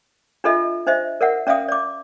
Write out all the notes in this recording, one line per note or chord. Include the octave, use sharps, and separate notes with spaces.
D4 F4 A4 D#5 E5
D4 C5 D#5 E5
A#4 D5 E5 F#5
C#4 D5 E5 F5 D#6
D5 D6